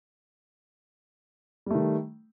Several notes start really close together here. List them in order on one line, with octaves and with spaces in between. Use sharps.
G3 A3 D#3